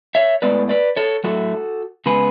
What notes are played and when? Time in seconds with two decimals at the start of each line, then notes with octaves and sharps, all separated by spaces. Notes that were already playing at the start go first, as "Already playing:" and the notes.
0.15 C#5 E5
0.42 A2 G#3 B3 B4 D5
0.69 B4 D5
0.97 A4 C#5
1.24 A2 F#3 A3 F#4 A4
2.06 C#3 G#3 B3 G#4 B4